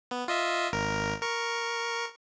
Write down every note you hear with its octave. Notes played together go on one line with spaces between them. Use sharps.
B3
F4 D#5 E5
G#1 A#4
A#4 C#6